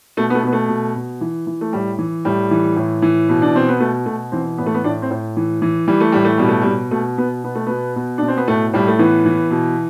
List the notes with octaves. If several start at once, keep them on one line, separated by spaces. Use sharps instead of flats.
B2 A3
B3
A3
B2 B3
A3
B2
B2
E3
E3
A3
A2 G3
E3
A2 G3
E3
A2
E3
B2
D4
B2 C4
B3
B2 A3
B2 A3
E3 C4
A2 B3
A3
B3
A2 D4
C4
A2
E3
E3
E3 G3
A3
A2 G3
A3
B2 G3
A3
B2 G3
B2 A3
B2 B3
B2 B3
A3
B2 B3
B2
B2 D4
C4
B3
A2 A3
A2 G3
A3
E3 B3
E3
B2